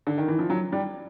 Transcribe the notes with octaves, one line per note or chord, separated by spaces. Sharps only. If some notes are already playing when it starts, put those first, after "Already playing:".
D3
D#3
E3
F3
F#3
G3